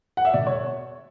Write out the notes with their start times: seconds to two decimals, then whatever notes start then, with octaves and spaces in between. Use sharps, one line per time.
0.17 F#5
0.25 E5
0.34 B2 D5
0.47 C#5